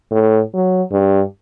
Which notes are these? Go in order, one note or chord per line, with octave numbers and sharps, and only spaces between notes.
A2
F#3
G2